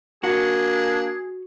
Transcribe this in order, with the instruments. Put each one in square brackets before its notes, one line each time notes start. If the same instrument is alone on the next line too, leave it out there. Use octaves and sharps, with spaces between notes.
[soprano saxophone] A#3 [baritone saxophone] D4 [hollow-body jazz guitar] F#4 [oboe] G#4